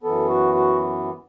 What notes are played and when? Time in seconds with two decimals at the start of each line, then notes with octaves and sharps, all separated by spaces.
0.03 F#2 E3 B3 A4
0.29 F#4
0.54 F#4